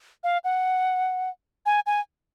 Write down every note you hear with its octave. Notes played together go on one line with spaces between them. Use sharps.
F5
F#5
G#5
G#5